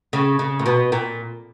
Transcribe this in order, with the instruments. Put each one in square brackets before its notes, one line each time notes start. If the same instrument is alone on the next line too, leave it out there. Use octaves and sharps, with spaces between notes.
[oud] C#3
C#3
A#2
B2
A#2